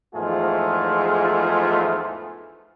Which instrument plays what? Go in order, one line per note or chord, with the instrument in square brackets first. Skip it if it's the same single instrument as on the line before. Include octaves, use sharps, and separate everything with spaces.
[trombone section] E2 G#2 F3 A3 F4 G#4